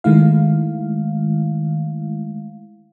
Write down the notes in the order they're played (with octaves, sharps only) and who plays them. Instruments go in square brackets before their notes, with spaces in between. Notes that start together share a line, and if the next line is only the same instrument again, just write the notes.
[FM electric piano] D#3 G#3 A3 E4 F5